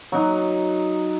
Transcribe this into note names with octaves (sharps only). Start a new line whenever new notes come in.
F#3 D#4